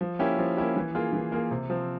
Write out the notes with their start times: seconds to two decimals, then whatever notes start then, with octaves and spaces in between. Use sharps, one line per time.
0.01 F3
0.19 A#3 C#4 E4 G4
0.38 F3
0.57 A#3 C#4 E4 G4
0.76 E3
0.95 A#3 F4 G#4
1.13 E3
1.32 A#3 F4 G#4
1.51 C3
1.70 F3 C4